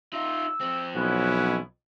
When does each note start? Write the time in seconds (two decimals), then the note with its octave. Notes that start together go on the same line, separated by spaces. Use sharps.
0.13 D#4 F4 E6
0.60 F2 C4
0.95 B1 B3 C#4 E4 F#5